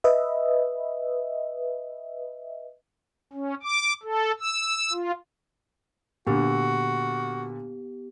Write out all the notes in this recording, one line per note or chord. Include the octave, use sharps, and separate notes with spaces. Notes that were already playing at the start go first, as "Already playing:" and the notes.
B4 D#5 E5
C#4
D6
A4
E6
F4
A#2 D3 B3 F#4 G4